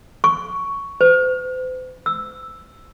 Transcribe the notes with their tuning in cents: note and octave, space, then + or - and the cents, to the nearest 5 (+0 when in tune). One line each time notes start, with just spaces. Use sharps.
C#6 +10
C5 -45
E6 +0